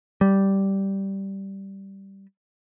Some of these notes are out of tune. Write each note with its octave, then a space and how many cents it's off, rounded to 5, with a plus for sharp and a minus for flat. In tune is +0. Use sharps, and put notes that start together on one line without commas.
G3 -5